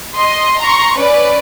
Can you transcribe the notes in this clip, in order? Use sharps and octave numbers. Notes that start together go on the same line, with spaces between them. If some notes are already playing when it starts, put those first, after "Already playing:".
D#5 C6
A#5 C6 C#6
C#4 B4 D5